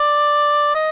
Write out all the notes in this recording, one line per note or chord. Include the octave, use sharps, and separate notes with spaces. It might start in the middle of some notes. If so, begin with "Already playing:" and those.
Already playing: D5
D#5